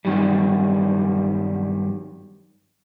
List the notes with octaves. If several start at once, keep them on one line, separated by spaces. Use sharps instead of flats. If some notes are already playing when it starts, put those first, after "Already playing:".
G2 A#2 D#3 F#3 G3